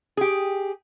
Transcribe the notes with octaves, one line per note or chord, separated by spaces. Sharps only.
G4 G#4